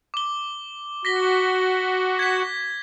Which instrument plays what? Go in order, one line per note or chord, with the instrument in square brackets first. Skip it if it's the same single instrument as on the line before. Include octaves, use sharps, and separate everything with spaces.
[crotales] D6 G7
[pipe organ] F#4 [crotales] A#6 B6 G7
[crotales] G#6 B6